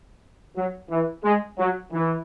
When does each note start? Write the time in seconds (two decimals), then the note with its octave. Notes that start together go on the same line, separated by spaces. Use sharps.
0.57 F#3
0.90 E3
1.24 G#3
1.58 F#3
1.92 E3